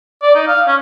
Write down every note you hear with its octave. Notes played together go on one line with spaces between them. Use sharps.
D5
D#4
F5
C#4